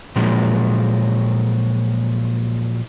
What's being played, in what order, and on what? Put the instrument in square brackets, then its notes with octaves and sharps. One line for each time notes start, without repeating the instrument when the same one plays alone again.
[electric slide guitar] A#2 F3 F#3 G#3 A#3